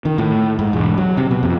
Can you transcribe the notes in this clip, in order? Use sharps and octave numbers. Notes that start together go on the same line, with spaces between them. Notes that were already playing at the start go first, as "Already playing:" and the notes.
D#3
A2
G#2
E1
F#3
C3
B2
F2